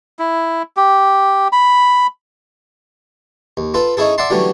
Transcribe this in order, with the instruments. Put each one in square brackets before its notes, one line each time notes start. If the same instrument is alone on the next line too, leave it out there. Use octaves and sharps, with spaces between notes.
[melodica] E4
G4
B5
[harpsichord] D#2
F4 A4 B4
C#4 D#4 E4 G#4 A4
D5 E5 F#5 A5 C6
D3 E3 F#3 G3 A3 C#4